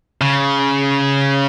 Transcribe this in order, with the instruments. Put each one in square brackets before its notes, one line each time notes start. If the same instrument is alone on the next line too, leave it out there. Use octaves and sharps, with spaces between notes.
[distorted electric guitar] C#3